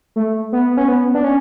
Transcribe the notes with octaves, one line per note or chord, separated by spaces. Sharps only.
A3
B3
C#4
B3
D4
C#4